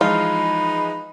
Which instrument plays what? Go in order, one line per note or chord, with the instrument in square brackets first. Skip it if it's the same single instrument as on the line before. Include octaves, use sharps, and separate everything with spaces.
[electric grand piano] E3 F3 G#3 [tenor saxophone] D#4 [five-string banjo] F4 [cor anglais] B4